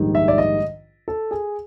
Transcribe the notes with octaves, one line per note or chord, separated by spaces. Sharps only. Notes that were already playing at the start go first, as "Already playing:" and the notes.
Already playing: A#1 G#2 D#3 G3
E5
D5
D#5
A4
G#4